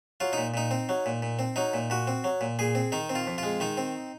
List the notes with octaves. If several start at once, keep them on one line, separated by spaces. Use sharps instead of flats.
F#3 F4
A#2 D#4
A#2 D#4
C4
F#3
A#2
A#2
C4
F#3 D#4
A#2
A#2 F#4
C4
F#3
A#2
A#2 G#4
C4
D#3 D#4
C4
F4
F2
G#3 F4
D#3 D#4
C4